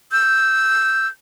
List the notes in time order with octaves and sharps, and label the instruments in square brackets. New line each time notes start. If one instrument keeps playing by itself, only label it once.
[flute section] E6 G6